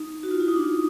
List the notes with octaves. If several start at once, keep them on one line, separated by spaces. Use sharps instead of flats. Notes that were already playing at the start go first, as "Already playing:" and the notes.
Already playing: D#4
F#4
F4
E4
D#4
D4